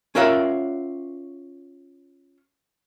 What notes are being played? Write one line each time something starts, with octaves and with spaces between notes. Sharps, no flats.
C#4 F4 A#4 D5 E5 F#5